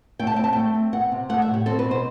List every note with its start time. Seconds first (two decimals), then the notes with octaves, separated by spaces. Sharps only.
0.19 A3 G5
0.27 A5
0.36 C4 G5
0.44 A5
0.53 A3 G5
0.75 C4
0.93 B3 F#5
1.12 C3
1.29 A3 F#5
1.42 E5
1.48 A2
1.54 G4
1.66 C4 A4
1.79 B4
1.84 B2
1.91 C5